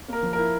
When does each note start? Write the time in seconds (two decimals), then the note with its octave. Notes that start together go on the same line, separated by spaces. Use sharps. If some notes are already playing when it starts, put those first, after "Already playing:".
0.08 A#3 A#4
0.22 F3
0.33 A#4
0.38 E4